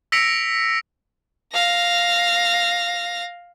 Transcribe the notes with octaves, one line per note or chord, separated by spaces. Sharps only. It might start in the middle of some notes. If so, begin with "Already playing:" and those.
E6 A#6 B6 C#7 D7 F7
F5 A#6